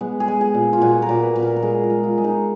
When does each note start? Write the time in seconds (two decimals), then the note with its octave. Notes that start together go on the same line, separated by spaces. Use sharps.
0.01 G#3 B3
0.20 G#4
0.28 G#3
0.41 G#4
0.54 A#2
0.73 F4
0.82 A#2 F#4
1.02 A#4
1.09 A#2
1.23 B4
1.36 A#2
1.42 A#4
1.56 A#4
1.62 G#3 G#4
1.84 F4
1.90 G#3
2.03 F4
2.18 G#3
2.24 D#4